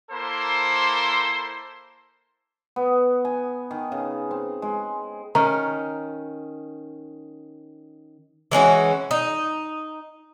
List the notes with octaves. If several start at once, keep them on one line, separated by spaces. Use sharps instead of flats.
A#3 E4 A4 C5 C6
B3
G#5
D#3
C#3
C4
G#3
D#3 C#4 A#5
E3 G#3 C#4 F#4
D#4